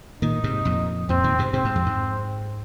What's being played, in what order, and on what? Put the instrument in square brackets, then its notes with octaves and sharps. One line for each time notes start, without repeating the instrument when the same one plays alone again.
[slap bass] A#2 D#3 [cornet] D#4
[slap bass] G#2 C3
F2 A#2
[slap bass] F2 A#2 [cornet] C4
[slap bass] A#2 D#3
G#2 C3
[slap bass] G#2 C3 [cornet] C4
[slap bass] G#2
F2
G#2